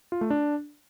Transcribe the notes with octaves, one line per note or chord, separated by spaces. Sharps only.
F4
A3
D4